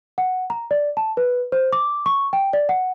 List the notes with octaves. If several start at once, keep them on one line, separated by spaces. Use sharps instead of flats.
F#5
A#5
D5
A5
B4
C5
D6
C#6
G5
D5
F#5